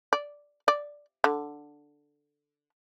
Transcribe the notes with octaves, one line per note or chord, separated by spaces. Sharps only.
D5
D5
D3